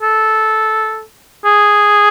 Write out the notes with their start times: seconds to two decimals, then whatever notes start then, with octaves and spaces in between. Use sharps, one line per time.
0.02 A4
1.45 G#4